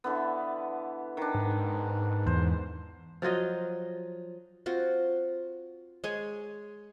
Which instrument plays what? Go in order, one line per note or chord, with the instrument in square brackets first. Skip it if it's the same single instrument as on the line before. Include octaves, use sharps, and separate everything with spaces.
[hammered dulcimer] D3 E3 B3
D#3 D4
[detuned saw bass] G#2
[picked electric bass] E2 [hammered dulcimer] C5
[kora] F3 F#3 F4 D#5
[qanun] C4 F4 F#4
G#3 G#4 C#5 G#5